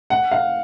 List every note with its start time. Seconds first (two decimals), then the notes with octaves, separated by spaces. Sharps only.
0.10 F#5
0.32 F5